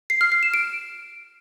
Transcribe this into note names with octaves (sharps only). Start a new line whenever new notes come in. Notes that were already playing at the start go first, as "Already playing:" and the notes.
C7
F6
C7
E7
D7